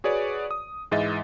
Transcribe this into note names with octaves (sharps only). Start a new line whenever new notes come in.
F#4 G#4 B4 C#5 D5
D#6
G#2 E3 G#3 D#5 E5 A6